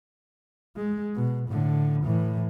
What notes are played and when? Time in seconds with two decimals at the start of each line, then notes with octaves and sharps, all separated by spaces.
0.76 G#3
1.15 B2
1.49 A2 D3
2.04 A2 E3